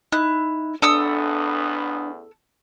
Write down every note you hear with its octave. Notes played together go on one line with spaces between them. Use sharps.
D#4 E4 F#6
A1 E2 B3 D4 A4 D#6 E6